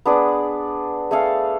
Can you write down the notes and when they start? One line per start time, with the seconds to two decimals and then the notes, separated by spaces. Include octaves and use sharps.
0.05 B3 D4 G#4 D5
1.11 A3 G#4 A4 F5